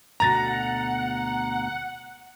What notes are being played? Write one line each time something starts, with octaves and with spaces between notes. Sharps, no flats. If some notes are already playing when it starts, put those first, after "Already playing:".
D2 B2 F#5 A#5 A6 A#6